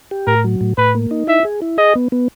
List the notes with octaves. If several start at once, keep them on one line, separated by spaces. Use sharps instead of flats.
G4
A2 A#4
F#3
A2
A2 B4
A#3
D#4
E4 E5
G#4
E4
G#4 D#5
B3
B3